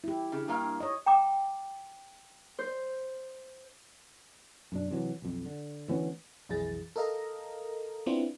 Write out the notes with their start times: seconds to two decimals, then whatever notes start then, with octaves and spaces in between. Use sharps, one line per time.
0.04 E4 G4
0.32 C#3
0.48 G2 A#3 F5
0.80 C#5 D#5
1.06 G5 A#5 D6
2.59 C5
4.72 F#2 B2 D4
4.91 C3 E3 F#3
5.22 B1 F2
5.46 D3
5.88 D2 E3 B3 C#4
6.49 B1 F2 E3 G#4 A6
6.96 A4 A#4 D#5 F5 A#5
8.06 B3 C4 D4 E4 F4 C5